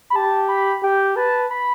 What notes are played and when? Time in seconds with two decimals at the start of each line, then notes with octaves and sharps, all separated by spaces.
0.10 B5
0.15 G4 A5
0.49 B5
0.82 G4 G5
1.16 B4 A5
1.51 B5